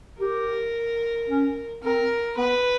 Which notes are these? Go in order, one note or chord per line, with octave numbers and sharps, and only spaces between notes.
G4 A#4
C#4
C4 A#4
B3 B4